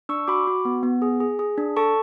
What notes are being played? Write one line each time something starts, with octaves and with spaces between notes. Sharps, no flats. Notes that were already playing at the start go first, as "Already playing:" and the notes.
D4 C#6 E6
F#4 B5 D6
F#4
B3
B3
G#4
G#4
G#4
D4
A4 A5 C#6